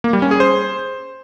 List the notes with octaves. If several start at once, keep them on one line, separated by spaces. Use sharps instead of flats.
A#3
G3
C#4
G#4
C5